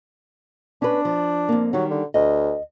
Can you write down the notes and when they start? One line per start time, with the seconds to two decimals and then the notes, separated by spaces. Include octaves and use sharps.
0.82 C#4 D4 B4
1.05 F3
1.49 F2 A#3
1.73 D#3 F#3 G3
1.91 D3
2.14 D2 D#5